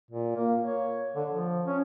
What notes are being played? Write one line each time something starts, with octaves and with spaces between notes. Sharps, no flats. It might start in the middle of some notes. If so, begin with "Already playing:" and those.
A#2
A#3
C#5
D3
F3
C#4